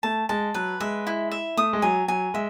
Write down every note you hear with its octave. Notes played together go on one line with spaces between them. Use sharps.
A3 A5
G#3 A5
F#3 B4
G#3 E5
E4
E5
A3 D#6
G#3
F#3 G#5
F#3 G#5
G#3 E5